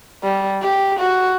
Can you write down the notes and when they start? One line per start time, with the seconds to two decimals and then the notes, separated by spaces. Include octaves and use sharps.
0.24 G3
0.62 G4
0.99 F#4